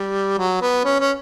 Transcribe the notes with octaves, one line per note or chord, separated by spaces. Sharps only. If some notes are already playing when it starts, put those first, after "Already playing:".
Already playing: G3
F#3
B3
C#4
C#4